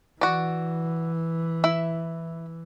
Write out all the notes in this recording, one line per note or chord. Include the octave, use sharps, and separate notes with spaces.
E3 F#4 D5
E4 E5